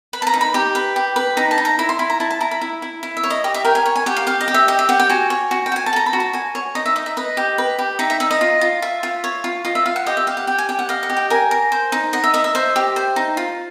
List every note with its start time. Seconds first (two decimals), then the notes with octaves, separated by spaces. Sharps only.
0.13 B4 B5
0.22 A5
0.27 A#5
0.34 D#4
0.41 B5
0.54 G4 B5
0.75 B4
0.96 G4
1.16 B4
1.37 D#4 A#5
1.51 A5
1.58 D#4
1.65 A#5
1.79 E4 B5
1.89 C6
1.99 E4 B5
2.10 A#5
2.20 E4 A5
2.31 A5
2.41 E4 A#5
2.51 B5
2.61 E4
2.82 E4
3.03 E4
3.17 E5
3.23 C#5
3.30 D#5
3.44 G4 D#5
3.54 E5
3.65 A#4 G5
3.75 G#5
3.86 C#5
3.96 G#5
4.06 G4 F#5
4.16 F5
4.27 G4 F5
4.41 D#5
4.48 G4
4.54 E5
4.68 G4 D#5
4.79 E5
4.89 G4 F#5
4.99 G5
5.10 F#4 G#5
5.30 C#5
5.51 F#4
5.66 G5
5.72 F#4 G#5
5.86 A5
5.93 A4 A#5
6.06 B5
6.13 F#4
6.20 A5
6.33 F#4 G#5
6.55 C#5
6.75 D#4 D#5
6.86 E5
6.96 D#4 D#5
7.06 E5
7.17 B4 D#5
7.37 G4
7.58 B4
7.79 G4
7.99 D#4 E5
8.10 E5
8.20 D#4 E5
8.31 D#5
8.41 F4
8.61 F4
8.82 F4 E5
9.03 F4
9.24 C#5
9.44 F4
9.65 F4 D#5
9.75 E5
9.86 F4 F5
9.96 F#5
10.06 G4 D#5
10.17 E5
10.27 G4 F5
10.37 F#5
10.47 G4 G5
10.58 G#5
10.69 G4 G5
10.79 F#5
10.89 D#5 F5
11.03 F#5
11.10 G4
11.17 G5
11.30 A#4 G#5
11.51 A#4
11.72 C5
11.92 D#4
12.13 D#5 F#5
12.24 E5
12.34 D#5 E5
12.44 E5
12.55 C5 E5
12.76 G4
12.96 C5
13.16 D#4
13.37 F4